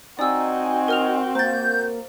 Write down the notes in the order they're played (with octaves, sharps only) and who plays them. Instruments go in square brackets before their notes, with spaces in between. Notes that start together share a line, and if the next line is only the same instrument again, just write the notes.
[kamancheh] C4 F#4 [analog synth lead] D#4 [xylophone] D5 E6 [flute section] G#5
[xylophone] A#4 F6 F7
[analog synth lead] A#3 [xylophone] C5 A6 [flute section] G6